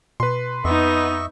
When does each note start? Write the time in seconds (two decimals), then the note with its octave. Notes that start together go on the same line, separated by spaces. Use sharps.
0.20 B2 B4 C6
0.65 F2 B3 D#4 D#5 E5 C#6